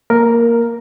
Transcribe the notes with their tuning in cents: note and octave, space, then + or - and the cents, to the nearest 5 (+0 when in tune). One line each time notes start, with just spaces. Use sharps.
A#3 -5 A#4 +0